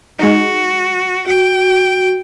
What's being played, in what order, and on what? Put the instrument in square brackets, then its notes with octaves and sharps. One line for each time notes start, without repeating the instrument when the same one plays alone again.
[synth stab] G#3 D#4 [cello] F#4
[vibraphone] F#4 [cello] G5